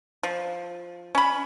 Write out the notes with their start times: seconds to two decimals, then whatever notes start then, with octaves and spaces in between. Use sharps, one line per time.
0.23 F3
1.15 C#4 B5